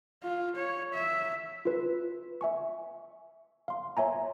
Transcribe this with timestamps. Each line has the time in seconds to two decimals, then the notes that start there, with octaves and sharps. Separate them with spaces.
0.23 F4
0.56 C#5
0.94 E5
1.65 F4 B4
2.41 E5 G#5 C#6
3.68 F5 C6
3.97 C#5 E5 G#5 A#5